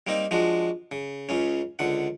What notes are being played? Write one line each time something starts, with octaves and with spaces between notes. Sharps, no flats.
G3 A#3 C4 D#4
F3 G#3 D4 F#4
C#3
C#2 C#3 C#4
C#2 D3 F#5